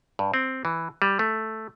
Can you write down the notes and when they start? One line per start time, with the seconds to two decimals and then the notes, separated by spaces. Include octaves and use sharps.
0.19 G2
0.34 C4
0.65 E3
1.02 G3
1.19 A3